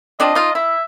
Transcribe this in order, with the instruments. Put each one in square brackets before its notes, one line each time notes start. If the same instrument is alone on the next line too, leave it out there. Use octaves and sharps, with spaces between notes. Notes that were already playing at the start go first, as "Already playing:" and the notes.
[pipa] C4 D4 F4 [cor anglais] D#5
[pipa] D#4 F4
[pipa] E4 [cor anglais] E5